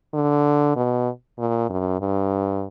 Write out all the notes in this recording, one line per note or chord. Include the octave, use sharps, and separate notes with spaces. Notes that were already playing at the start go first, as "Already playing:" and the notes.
D3
B2
A#2
F#2
G2